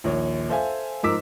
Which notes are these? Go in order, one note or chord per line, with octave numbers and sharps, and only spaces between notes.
A#1 D#2 C#5
A4 C5 E5 F5 G#5
G#2 F3 A#4 D6 E6 B6